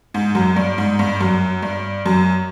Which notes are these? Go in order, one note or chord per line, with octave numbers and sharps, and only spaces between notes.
G#2
F#2
G2
G#2
G2
F#2
G2
F#2